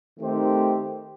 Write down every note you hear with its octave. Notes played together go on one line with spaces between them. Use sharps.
D#3 A3 C4 G4 C5